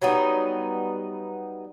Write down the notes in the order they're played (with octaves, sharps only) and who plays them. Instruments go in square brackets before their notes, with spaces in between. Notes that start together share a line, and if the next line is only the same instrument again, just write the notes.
[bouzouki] F#3 G3 B3 D#4